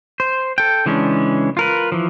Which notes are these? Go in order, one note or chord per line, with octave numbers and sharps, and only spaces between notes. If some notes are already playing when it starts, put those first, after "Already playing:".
C5
A4 G5
C#3 E3 G#3 C#4 D4
F4 A#4 B4
E3 F3